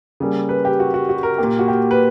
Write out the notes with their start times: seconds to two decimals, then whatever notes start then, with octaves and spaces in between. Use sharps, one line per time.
0.20 C#3 G3 A#3
0.49 B4
0.65 G4
0.80 F#4
0.94 F#4
1.09 F#4
1.23 A#4
1.38 A#2 A#3 G4
1.59 F#4
1.68 G4
1.91 B4